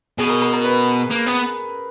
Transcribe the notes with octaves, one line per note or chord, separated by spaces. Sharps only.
B2 G#4
A#4
A#4
A#4
B4
A#3
B3